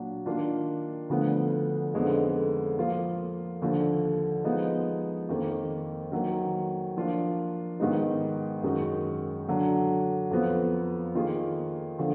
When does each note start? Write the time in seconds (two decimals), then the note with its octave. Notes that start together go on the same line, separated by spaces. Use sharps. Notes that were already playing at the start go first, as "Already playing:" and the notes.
Already playing: A#2 F#3 D4
0.26 D#3 A#3 D4 F4
1.09 D2 D3 F3 B3
1.93 F2 D3 G#3 B3 D#4
2.78 F3 A#3 F4 A#4
3.62 D#2 D3 F3
4.44 F3 G#3 B3 D#4
5.29 F2 D#3 A#3
6.12 D#3 F#3 A#3
6.97 F3 A#3 D4 F4
7.80 G#2 D#3 G#3 B3 D#4
8.63 F#2 D#3 G#3 D#4 F#4
9.48 D3 F#3 D4
10.31 F2 F3 B3 F4
11.15 D#3 A#3 F4 G#4
11.99 D3 F3